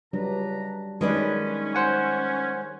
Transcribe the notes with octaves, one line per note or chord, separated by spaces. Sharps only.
C#2 F#3 G3 D4 B4 A#5
D#3 F#3 G#3 C#4 D4 B4 D5
C5 F#5 G#5